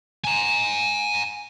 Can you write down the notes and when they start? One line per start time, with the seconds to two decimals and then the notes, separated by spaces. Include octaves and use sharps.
0.25 G#5 A#5